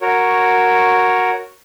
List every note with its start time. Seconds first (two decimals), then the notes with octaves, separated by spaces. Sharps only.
0.01 F#4 A#4 C#5